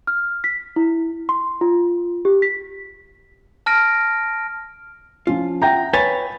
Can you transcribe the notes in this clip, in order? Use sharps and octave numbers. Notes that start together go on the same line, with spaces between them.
F6
B6
E4
C6
F4
G4
B6
A5 F6 A#6 D7
F3 C#4 F4
E5 F#5 G5 A#5 G6 A#6
B4 C#5 G#5 A6